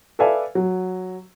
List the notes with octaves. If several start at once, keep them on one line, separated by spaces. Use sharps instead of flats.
A4 B4 D5 E5 F5 G#5
F#3